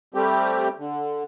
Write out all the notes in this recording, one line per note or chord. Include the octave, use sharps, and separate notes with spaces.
G3 A3 C4 G4
D3